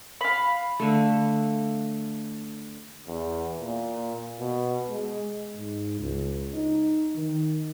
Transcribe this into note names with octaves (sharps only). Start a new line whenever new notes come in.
F5 B5
D3 A3
E2
A#2
B2
G#3
G#2
C#2
D#4
D#3